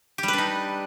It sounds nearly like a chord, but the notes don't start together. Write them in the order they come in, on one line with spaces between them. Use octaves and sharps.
G4 G3 B4 D4 D#4